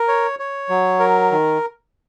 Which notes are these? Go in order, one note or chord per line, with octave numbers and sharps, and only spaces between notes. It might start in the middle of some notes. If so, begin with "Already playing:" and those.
Already playing: A#4
C#5
C#5
F#3
A#4
D#3